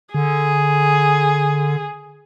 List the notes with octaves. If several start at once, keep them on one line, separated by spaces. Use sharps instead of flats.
D3 G#4